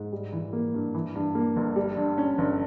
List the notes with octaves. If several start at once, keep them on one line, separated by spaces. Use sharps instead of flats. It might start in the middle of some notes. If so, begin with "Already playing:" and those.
Already playing: G#2
G3
E3
A#3
G2
E3
G2
A#3
G1
G3
G2
C#4
G1